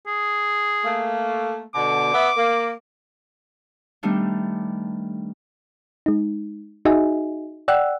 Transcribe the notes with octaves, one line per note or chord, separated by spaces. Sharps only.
G#4
A3 A#3
B2 D3 D6
B3 E5
A#3
D#3 G3 A3 B3 D4
G#3 D#4
D#4 F#4 G#4 D#5 E5 G#5
D5 F#5 G5 E6 F#6